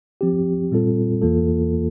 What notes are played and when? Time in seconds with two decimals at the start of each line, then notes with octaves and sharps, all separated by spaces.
0.21 F3 C4 G4
0.71 A#2 G3 C4 F4 A4
1.22 E2 E3 A#3 F4 A4